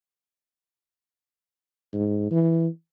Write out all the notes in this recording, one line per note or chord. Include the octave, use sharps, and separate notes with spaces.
G#2
E3